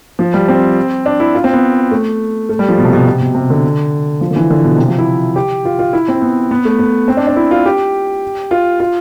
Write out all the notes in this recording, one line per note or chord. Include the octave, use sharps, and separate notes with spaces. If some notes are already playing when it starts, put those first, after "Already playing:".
F3
G3
C4
D4
E4
F4
C4
B3
A3
A3
G3
F3
B2
C3
B2
C3
B2
C3
D3
F3
D3
E3
D3
B2
C3
F3
E4
G4
F4
F4
E4
C4
B3
B3
A3
B3
C4
D4
D4
E4
F4
G4
F4
F4